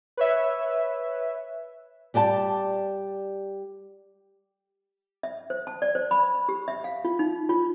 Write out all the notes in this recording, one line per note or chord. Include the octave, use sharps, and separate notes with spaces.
B4 C#5 E5
G3 G4 D5 G5 A5
E5
C5
A5
D5
C5
B5
G4
E5
F5
F4
D#4
F4